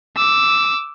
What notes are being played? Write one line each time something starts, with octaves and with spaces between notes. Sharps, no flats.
D6 E6